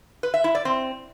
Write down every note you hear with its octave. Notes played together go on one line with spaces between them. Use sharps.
B4
E5
E4
D5
C4